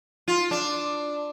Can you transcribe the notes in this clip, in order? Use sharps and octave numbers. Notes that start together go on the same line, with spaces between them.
F4
D4